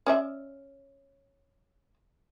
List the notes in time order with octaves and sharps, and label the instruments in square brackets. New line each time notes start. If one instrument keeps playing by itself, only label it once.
[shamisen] C#4 D5 E5